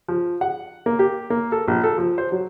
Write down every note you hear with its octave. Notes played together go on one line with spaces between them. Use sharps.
F3
F#5
A#3
G4
A#3
A4
A#1
A4
F3
C5
F#3